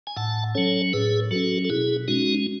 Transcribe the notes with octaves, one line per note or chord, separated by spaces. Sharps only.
G#5
A2 F#5 A5
F#3 C#4 A4 C#5
A2 G#4 B4
F#3 C#4 F#4 A4
A4
B2 E4 G#4
G#3 C#4 D#4 F#4